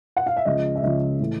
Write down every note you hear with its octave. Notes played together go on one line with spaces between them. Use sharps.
F#5
F5
E5
C#2 C#3 F3 D#5
E5
C#2 C#3 F3 D#5
A2 E3 A3